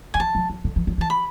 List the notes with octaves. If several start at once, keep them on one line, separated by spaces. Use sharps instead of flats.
D3 G#5
E3 A5
F#3
F#3
D3
E3
F#3
E3 A5
B5